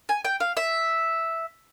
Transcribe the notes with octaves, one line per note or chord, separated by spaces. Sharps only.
G#5
G5
F5
E5